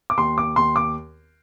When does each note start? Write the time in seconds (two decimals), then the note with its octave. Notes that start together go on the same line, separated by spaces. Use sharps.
0.10 D6
0.17 D#2 C6
0.38 D6
0.56 D#2 C6
0.76 D6